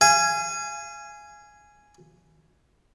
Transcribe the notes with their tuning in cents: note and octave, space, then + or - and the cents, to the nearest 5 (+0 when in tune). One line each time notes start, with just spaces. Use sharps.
F5 -35 G#5 +0